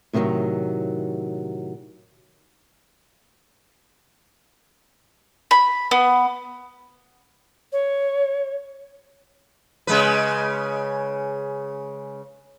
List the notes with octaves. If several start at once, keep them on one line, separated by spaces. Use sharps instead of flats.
A2 C3 D#3 F3 F#3
B5
B3
C#5
C#3 G#3 B4